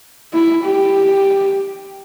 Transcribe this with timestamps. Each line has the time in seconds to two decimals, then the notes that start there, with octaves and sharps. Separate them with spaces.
0.33 E4
0.64 G4